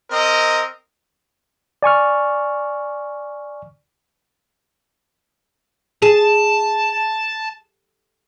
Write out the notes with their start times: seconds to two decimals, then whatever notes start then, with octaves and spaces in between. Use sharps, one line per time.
0.11 C4 A#4 D#5
1.83 D5 G#5 C#6 F6
6.02 G#4 A5